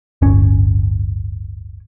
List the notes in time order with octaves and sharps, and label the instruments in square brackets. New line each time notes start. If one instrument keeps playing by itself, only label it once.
[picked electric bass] D1 G1 C#4